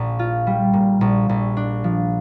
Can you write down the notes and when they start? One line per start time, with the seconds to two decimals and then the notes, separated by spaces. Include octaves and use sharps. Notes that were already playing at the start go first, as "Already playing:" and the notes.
Already playing: A#1 A#2 A#3
0.19 F4
0.47 G3
0.73 A#2
1.01 A#1
1.29 A#1
1.57 D4
1.84 F3